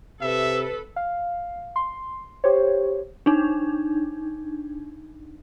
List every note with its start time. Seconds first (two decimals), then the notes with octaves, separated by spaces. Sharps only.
0.22 C3 A4 B4 E5
0.96 F5
1.76 C6
2.44 G4 C5 C#5
3.26 D4 D#4